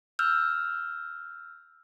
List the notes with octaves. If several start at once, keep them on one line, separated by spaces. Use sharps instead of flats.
E6 F6 G6